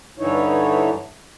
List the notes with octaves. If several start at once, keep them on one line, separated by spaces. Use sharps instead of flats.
G2 D3 E3 D#4 E4 C#5